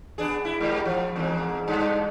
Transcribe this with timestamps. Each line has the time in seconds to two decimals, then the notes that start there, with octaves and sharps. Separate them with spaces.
0.18 B3 D4 G#4
0.45 E4
0.60 G#2 G3
0.85 F3
1.16 E2 G#2
1.68 G2